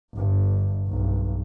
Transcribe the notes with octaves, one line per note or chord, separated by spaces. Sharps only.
G1 G2
B1 G2